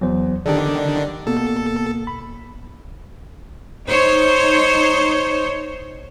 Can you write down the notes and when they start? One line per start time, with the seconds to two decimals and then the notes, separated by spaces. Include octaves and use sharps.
0.01 E2 F#3 C5
0.46 D3 D#3 D4 G4 A4 D5
1.27 B2 A#3 A4
2.07 B5
3.88 D#4 C5 C#5